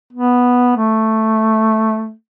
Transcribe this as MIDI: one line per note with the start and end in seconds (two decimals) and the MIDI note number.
0.13 0.75 59
0.76 2.11 57